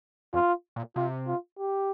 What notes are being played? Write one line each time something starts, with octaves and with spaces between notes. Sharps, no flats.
F2 F4
A#2
C3 F4
F4
G4